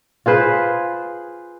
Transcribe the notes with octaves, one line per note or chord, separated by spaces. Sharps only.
F4 G#4 B4 C5